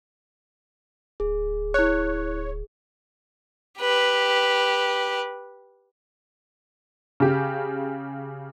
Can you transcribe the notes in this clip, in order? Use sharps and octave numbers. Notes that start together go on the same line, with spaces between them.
D1 G#4
E4 C#5 F#6
G4 B4
C#3 G4